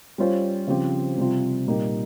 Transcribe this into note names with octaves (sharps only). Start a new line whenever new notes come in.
G3 C#4 F4 C5
C#3 F3 C4 G4
C3 G3 C4 F4
A#2 G3 A#3 D#4 G4